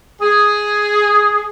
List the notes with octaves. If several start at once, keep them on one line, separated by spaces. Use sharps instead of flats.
G#4